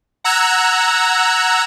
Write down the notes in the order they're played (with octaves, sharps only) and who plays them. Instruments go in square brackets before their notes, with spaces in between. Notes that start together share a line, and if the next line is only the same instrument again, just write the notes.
[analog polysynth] F#5 A#5 E6 F#6 G#6